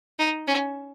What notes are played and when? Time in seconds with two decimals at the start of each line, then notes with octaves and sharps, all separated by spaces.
0.19 D#4
0.47 C#4